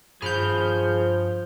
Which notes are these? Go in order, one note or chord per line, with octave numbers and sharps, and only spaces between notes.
G2 F3 G#4 B5 F6 G6